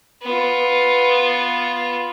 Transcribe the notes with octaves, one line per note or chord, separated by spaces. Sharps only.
B3 F4